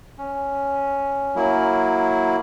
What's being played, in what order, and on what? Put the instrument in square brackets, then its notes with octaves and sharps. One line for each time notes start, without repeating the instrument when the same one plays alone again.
[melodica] C#4
[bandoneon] F#3 A#3 E4